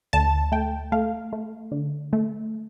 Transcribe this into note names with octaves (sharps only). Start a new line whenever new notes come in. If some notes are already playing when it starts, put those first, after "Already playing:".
D2 A5
A3 G5
A3 F5
A3
D3
A3